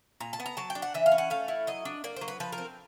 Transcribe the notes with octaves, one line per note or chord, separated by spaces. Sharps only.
A#2 A#5
A5
B3
A#5
F#3 A5
G5
D4
F#5
E3 E5
F5
C#4
F#5
A3 F5
E4
F#3 D#5
D4
A#3 D5
F#3 C5
B4
F3 B4
A#4
C4